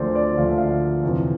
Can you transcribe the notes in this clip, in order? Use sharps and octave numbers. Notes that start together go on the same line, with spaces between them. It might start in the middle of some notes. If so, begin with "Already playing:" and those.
Already playing: D2 D3 F3 A#4 C5 D5
D5
D2 D3 F3 F5
E5
F5
F2 C3 E3